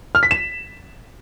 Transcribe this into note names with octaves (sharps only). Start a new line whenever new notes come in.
F6
B6
E7